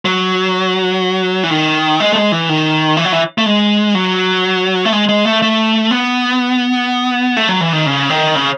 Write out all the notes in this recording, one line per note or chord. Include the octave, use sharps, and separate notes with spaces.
F#3
E3
D#3
G#3
A3
G#3
E3
D#3
E3
F#3
E3
A3
G#3
F#3
A3
G#3
G#3
A3
A3
B3
A3
F#3
E3
D#3
C#3
D#3
C#3